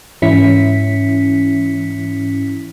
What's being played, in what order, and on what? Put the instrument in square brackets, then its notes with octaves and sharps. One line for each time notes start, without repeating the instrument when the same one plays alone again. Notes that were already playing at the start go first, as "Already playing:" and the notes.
[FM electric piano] G#2 E3 C#4 E4 B6 C#7